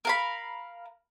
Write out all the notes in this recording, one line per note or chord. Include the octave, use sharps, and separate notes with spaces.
A#4 F5 B5